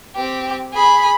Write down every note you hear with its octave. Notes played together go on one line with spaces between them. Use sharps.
C4 G4
G#4 B5